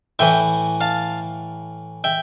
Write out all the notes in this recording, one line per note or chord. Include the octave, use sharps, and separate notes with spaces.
A2 E3 E5 G5
F5 A5
E5 G5